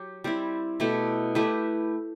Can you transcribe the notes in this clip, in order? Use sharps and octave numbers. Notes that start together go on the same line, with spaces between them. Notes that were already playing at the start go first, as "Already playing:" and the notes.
Already playing: F#3 G4
G3 C4 E4
B2 A3 E4 G4
A3 E4 G4 B4